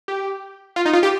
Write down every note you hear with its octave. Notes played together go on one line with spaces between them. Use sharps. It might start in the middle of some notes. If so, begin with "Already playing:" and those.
G4
F4
D#4
F4
G4